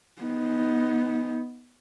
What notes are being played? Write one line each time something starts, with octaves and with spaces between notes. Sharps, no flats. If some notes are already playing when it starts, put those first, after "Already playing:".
B3 D#4